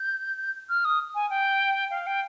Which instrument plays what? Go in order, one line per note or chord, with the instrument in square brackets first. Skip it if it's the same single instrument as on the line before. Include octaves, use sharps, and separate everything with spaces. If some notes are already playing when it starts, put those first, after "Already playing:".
Already playing: [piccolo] G6
F6
D#6
G#5
G5
F5
G5